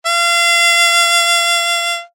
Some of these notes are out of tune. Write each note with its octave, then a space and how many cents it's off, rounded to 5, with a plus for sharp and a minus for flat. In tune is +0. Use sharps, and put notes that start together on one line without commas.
F5 -30